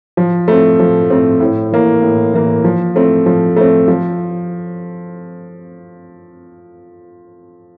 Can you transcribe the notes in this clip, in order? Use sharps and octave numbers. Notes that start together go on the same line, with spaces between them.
F3
A3 C4
F3
A3 C4
A2
E3 A#3
A2
E3 A#3
F3
A3 C4
F3
A3 C4
F3